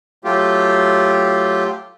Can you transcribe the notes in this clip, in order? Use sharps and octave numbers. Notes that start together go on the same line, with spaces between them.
F#3 A3 F4 G4